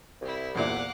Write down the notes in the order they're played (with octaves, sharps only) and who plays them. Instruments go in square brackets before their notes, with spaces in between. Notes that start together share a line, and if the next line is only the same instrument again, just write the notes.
[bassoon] C2 [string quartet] C4 E4
[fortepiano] E2 A#2 E4 [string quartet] F5 F#5 D6